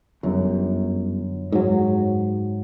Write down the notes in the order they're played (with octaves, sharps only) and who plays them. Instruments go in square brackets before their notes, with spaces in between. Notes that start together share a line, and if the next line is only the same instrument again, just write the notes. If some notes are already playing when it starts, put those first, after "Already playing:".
[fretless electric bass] G1 [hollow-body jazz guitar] F#2
[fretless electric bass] G#2 F#3